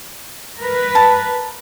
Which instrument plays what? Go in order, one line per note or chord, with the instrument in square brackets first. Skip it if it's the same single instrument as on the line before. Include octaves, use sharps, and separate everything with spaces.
[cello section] A#4 B4
[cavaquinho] A5